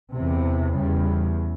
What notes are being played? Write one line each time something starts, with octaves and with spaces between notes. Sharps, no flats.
E2 C3
E2 C#3 G3